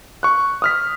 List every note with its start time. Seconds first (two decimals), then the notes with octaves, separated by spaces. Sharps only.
0.23 C#6 F#6
0.62 D#6 F6 B6